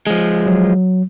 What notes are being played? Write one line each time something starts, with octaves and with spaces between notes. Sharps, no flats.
F3 G#3
F#3